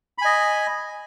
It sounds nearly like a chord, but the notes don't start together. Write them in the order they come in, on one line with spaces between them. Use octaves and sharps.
B5 G#5 D#5